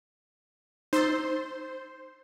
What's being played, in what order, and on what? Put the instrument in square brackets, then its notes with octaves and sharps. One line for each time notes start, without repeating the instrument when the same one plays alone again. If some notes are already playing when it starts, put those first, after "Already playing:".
[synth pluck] D#4 E6 A6 [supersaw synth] C5 C6